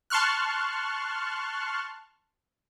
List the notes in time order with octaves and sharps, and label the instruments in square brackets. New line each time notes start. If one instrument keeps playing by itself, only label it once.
[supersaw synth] A5 C6 C#6 F6 F#6